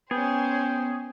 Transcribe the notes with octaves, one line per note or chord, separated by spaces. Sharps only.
B3 C#4 G#4 C5 G5